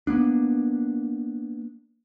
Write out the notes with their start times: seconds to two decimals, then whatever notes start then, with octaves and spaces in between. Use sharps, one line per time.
0.07 A#3 B3 D4